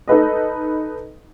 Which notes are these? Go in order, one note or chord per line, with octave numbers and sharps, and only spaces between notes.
D#4 A4 B4 D#5